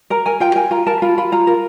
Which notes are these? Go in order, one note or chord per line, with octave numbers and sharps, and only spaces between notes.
A#4 A#5
A#4 G#5
F4 G5
A#4 G#5
F4 A#5
A#4 A5
F4 B5
F4 B5
F4 A#5
A#4